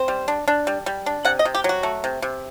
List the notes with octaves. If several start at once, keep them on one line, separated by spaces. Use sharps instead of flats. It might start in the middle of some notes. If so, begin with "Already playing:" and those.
Already playing: C4 C5
G3
D4
D4
G3
G3
D4
C3 F#5
D#5
C3
G4
F#3 F#4
A3
C3
C3